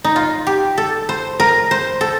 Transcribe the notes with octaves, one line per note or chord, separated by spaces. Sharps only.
D#4
F4
G4
A4
C5
A#4
C5
A4